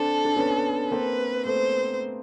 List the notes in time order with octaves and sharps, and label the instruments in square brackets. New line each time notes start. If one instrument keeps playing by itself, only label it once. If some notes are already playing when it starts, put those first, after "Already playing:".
Already playing: [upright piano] C4 D4 [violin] A4
[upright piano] D4
B3 C#4
[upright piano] A#3 C4 [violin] B4
[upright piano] A3 B3 [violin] C5